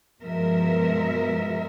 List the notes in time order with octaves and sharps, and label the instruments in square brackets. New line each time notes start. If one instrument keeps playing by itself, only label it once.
[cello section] G2 B2 F3 G#3 A#4 E5